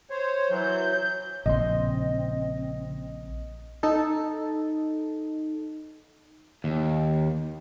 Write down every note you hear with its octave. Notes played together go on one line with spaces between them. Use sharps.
C5 C#5
E3 F#3 G6
A#1 C#3 C4 D#5 C6
D#4 A4
D#2